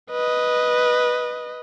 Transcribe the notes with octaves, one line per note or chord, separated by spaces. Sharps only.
B4 D#5